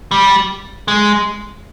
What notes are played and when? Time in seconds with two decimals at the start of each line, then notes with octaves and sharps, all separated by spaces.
0.11 G3
0.88 G#3